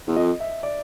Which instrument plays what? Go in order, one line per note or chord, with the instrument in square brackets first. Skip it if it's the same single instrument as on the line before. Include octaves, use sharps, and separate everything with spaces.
[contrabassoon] E2
[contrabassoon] F2 [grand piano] D#5
[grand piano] E5
D5